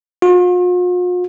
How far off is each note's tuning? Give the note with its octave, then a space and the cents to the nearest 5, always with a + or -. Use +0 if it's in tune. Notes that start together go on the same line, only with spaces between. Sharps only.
F4 +45